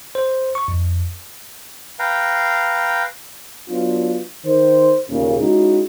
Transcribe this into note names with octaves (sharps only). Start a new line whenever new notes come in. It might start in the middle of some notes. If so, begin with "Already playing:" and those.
C5
C#6
F2
B4 F5 G5 A#5
F#3 B3 D4 F4
D#3 C5
D#2 A#2 C#3
G#3 C#4 D#4 E4 F#4